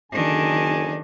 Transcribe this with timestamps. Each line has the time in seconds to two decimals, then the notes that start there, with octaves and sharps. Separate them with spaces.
0.12 F#1 D3 D#3 D4 G#5